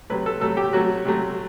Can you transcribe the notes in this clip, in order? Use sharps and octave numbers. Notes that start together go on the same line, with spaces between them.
C3 F#3 A3 B4
A4
C3 F#3 A3 A4
G4
C3 F#3 A3 F#4
C3 F#3 A3